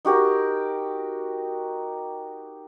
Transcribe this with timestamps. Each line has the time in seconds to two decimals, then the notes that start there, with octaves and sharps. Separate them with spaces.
0.05 D#4 F#4 G4 A#4